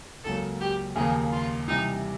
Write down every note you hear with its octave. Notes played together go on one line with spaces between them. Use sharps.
C#2 C#3 F#3 A#3 A4
G4
D#2 C#3 F3 A#3 G#4
F4
C3 E3 G3 D#4